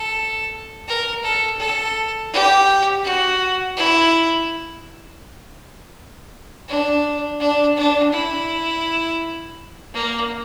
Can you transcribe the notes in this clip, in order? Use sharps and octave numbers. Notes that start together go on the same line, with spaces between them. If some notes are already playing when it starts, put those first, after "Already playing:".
Already playing: A4
A#4
A4
A4
G4
F#4
E4
D4
D4
D4
E4
A#3